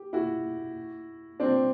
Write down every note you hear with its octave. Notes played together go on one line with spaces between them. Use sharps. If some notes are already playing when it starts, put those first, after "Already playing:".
Already playing: G4
E4 F#4
C4 D4